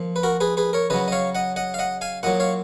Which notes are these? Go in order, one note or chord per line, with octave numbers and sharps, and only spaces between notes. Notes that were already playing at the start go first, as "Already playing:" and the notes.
Already playing: A#2 F3
B4
F#4 A#4
G#4 B4
G#4 B4
A#4 C#5
C#3 F#3 B4 D#5
D#5
C#5 F5
D#5 F#5
D#5 F#5
F5
D#5 F#5
F5 G#5
A#2 F#3 D#5 F#5
C#5 F5